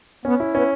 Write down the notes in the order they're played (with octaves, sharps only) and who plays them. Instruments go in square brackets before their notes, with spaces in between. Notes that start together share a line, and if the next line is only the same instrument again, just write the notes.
[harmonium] B3 [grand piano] C#4
[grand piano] E4
[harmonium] B3 [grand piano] C#4